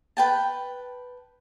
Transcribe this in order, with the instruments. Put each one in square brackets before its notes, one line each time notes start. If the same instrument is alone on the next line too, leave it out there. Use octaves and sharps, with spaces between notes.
[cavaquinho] B4 G5 A5